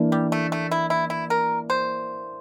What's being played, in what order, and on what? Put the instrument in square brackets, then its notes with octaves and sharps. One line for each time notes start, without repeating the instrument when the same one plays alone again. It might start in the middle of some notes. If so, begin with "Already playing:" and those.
Already playing: [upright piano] E3 A#3 D4
[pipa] G3
A3
A3
E4
E4
E4
A#4
C5